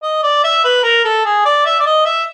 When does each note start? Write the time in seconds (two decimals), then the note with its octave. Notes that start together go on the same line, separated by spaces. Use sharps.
0.03 D#5
0.23 D5
0.44 E5
0.64 B4
0.84 A#4
1.05 A4
1.25 G#4
1.45 D5
1.66 E5
1.80 D5
1.86 D#5
2.05 E5